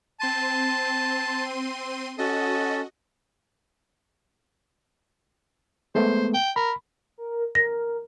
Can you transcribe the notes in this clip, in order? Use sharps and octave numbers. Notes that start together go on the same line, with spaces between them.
C4 A5 C6 D#7
C#4 F#4 A4 D#5
G#3 A3 B3 C5
G5
A#4 B5
A#4
A#4 A#6